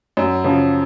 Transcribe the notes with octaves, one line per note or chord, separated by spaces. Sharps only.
F#2
C#3 F3